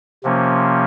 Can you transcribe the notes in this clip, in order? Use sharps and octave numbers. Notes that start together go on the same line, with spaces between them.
C3 F3 A#3 C#4